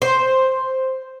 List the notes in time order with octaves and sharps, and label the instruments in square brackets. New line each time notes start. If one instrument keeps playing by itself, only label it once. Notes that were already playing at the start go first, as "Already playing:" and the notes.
[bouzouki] C5